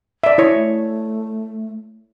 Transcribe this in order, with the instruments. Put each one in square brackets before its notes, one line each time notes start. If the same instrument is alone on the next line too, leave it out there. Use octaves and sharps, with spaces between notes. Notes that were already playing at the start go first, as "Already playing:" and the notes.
[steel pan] D5 E5
E4 C#5
[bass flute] A3